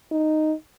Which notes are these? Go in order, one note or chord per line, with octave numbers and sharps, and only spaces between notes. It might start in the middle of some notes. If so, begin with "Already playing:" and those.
D#4